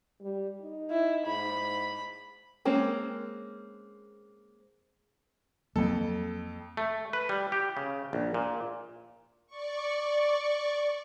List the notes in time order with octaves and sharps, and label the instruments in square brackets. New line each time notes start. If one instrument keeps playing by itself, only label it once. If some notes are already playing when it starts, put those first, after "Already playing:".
[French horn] G3
D#4
[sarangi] E4
[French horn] G#2 [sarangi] B5
[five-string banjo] G#3 A#3 C4 C#4
[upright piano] F2 A4 [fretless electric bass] F#3 A#3
[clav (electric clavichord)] A3
B4
G3
G4
C#3
A#1
A#2
[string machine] D5 C#6